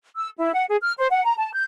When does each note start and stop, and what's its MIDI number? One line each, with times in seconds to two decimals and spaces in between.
0.17 0.29 88
0.37 0.52 64
0.53 0.65 78
0.69 0.77 68
0.81 0.92 89
0.98 1.07 72
1.10 1.21 78
1.25 1.35 82
1.38 1.52 81
1.54 1.64 91